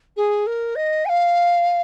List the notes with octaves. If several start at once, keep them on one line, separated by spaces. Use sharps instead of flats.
G#4
A#4
D#5
G#5
F5